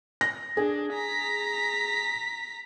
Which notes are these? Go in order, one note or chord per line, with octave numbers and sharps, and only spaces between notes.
A#6
D4 G#4
A#5 B6